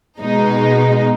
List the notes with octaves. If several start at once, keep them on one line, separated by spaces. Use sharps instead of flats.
B2 G#3 D#4